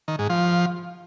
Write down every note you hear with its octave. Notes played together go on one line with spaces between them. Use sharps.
D#3
G#2
F3